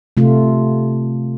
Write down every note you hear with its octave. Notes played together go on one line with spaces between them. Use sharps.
C3 A3 F4